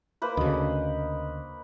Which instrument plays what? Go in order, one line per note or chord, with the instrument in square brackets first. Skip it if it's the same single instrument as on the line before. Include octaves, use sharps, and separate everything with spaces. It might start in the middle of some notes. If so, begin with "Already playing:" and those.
[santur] A#3 B4 C5
[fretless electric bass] D2 C#3 [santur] D#5